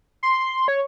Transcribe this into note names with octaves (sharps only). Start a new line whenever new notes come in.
C6
C#5